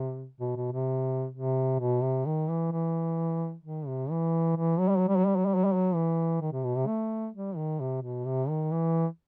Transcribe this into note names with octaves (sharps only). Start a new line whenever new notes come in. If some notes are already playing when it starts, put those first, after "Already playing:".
Already playing: C3
B2
B2
C3
C3
B2
C3
D#3
E3
E3
D#3
C3
E3
E3
F#3
G3
F#3
G3
F#3
G3
F#3
G3
F#3
G3
F#3
E3
D#3
C3
B2
C3
A3
G3
D#3
C3
B2
C3
D#3
E3